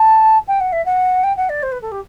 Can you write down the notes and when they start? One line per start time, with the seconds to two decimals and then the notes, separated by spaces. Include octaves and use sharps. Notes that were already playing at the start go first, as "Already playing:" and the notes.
Already playing: A5
0.48 G5
0.60 F#5
0.72 E5
0.85 F#5
1.24 G5
1.37 F#5
1.49 D5
1.63 C5
1.72 B4
1.82 A4
1.92 G4